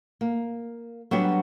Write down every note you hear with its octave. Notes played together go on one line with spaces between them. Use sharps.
A#3
F#3 G3 B3 D4 F#4